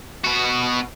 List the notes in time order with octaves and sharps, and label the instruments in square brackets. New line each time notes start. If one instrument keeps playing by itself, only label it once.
[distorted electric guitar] B2 F#4